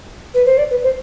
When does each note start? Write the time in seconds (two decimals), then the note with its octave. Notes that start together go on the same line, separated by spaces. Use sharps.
0.34 B4
0.45 C5
0.57 D5
0.70 B4
0.83 C5